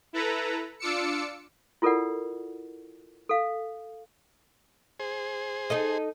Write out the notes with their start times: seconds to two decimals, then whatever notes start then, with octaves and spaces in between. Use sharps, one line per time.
0.13 E4 A4 B4 A#5
0.79 D4 F4 D6 E6 C#7
1.82 E4 F4 A4 A#4 D5 F#5
3.29 A4 F5
5.00 G#4 C5
5.70 D#4 A4 D#5